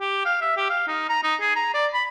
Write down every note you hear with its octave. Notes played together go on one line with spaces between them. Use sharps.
G4
F5
E5
G4
F5
D#4
A#5
D#4
G#4
A#5
D5
B5